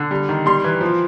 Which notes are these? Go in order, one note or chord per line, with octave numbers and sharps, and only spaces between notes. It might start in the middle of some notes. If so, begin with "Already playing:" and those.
Already playing: D3
G3
D#3
G3 C6
E3
F3